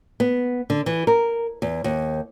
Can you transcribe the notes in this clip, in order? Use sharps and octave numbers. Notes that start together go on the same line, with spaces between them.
B3
D3
E3
A#4
E2
D#2